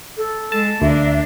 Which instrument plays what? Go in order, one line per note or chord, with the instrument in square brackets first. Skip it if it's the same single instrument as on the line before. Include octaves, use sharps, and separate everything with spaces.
[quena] A4
[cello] G#3 [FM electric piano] A5
[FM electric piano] D2 [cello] A#3 D4 [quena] E5